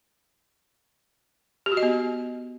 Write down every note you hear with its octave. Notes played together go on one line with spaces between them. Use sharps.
G4
F#4
D#5
B3